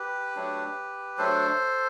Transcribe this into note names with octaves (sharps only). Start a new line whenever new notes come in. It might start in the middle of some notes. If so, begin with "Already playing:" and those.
Already playing: G4 B4
F#3 A3 D4
F#3 A3 D4 A4 C5